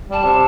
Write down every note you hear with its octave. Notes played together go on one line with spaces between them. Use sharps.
G3 A5
C3